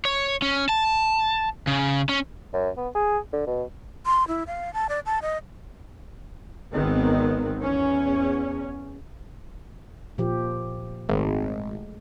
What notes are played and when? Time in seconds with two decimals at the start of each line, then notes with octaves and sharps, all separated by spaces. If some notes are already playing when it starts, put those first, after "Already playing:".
0.05 C#5
0.42 C#4
0.69 A5
1.67 C#3
2.09 C#4
2.54 F#2
2.77 B3
2.95 G#4
3.33 D3
3.47 B2
4.06 C6
4.28 E4
4.47 F5
4.74 A5
4.89 D5
5.06 A5
5.22 D#5
6.72 G#1 D#3 B3 C4
7.61 E2 C#4
10.18 A#2 F3 G4
11.09 G#1 G#3 A3